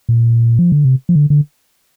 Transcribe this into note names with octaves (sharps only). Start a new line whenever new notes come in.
A#2
F3
D3
C3
F3
D3
D3